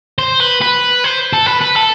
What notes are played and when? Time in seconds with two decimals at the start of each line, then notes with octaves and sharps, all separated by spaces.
0.19 C5
0.40 B4
0.62 B4
1.04 C5
1.33 A4
1.46 B4
1.61 B4
1.75 A4